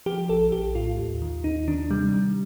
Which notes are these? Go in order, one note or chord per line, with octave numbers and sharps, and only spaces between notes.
F3 G4
A#1 A4
A#1 G4
A2 F4
D#2
D#3
D#2 D#4
D#3 D4
C3 G3
D#3